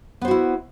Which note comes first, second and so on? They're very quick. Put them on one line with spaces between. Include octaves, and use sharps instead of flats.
B3 C5 F#4 E4